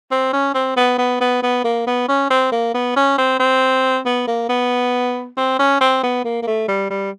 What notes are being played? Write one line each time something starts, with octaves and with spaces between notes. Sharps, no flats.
C4
C#4
C4
B3
B3
B3
B3
A#3
B3
C#4
C4
A#3
B3
C#4
C4
C4
B3
A#3
B3
C4
C#4
C4
B3
A#3
A#3
A3
G3
G3